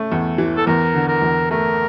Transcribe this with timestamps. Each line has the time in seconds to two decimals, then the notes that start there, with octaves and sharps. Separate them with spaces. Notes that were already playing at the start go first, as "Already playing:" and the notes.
Already playing: A3 C#4
0.12 E2
0.38 E3
0.57 A4
0.67 E2 A#4
0.94 D3
1.08 A#4
1.22 E2
1.51 A3 A#4